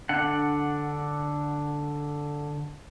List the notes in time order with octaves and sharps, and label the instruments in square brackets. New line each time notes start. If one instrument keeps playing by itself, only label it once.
[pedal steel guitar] D3 D4 F#5